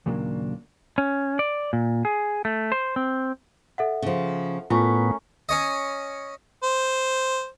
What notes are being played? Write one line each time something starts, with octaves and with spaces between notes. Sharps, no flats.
D#2 A#2 C#3 F#3 A#3 D4
C#4
D5
A#2
G#4
A3
C5
C4
A4 E5 F#5
C#3 F3
A2 A3 B3 C#4 F4 A#4
C#4 C#5 D#5
C5